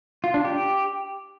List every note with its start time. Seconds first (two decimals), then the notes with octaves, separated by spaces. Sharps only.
0.24 F4
0.34 D4
0.45 G4